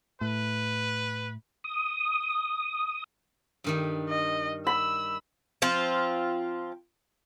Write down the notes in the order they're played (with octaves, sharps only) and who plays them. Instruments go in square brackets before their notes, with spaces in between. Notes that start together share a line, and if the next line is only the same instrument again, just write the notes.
[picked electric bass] A2 [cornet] B4
[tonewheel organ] D#6
[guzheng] G2 D#3 G3
[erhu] D#5
[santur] B5 [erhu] E6
[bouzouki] F3 C4 F4